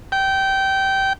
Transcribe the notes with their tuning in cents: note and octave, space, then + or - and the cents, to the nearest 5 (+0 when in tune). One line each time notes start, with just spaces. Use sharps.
G5 -20